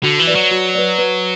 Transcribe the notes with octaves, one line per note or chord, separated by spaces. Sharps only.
D3 F#4
E3
B4 D5
F#3
F#4
B4 D5
B4